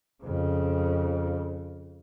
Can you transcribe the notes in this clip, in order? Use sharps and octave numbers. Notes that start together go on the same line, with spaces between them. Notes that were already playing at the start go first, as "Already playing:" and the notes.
F2 C#3